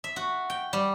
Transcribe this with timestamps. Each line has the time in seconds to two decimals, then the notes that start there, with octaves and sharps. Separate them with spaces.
0.04 E5
0.16 F#4
0.50 G5
0.73 G3